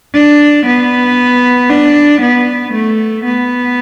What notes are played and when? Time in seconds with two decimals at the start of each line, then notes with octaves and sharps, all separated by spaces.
0.14 D4
0.66 B3
1.69 D4
2.21 B3
2.72 A3
3.24 B3